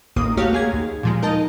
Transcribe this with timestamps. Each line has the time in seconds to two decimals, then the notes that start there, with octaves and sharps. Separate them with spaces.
0.16 A1 D#2 A#3 D#6
0.37 A3 F#4 G4 C#5 F5
0.53 A#3 G#4 G#6
0.73 D#2
1.03 A#2 F3 G#3
1.22 D#4 A#4 D#5 A5